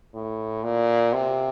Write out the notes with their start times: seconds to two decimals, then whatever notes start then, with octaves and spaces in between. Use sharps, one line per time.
0.14 A2
0.63 A#2
1.13 C3